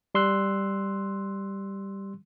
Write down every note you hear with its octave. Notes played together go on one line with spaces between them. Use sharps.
G3 C6 E6 F#6